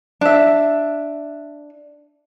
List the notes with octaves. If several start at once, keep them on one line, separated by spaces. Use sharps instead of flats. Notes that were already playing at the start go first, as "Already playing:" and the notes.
D4 E5